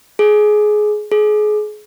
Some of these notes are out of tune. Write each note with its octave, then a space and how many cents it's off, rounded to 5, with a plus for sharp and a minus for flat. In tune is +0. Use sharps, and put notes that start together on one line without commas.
G#4 +20
G#4 +30